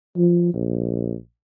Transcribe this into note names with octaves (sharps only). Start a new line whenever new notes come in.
F3
A#1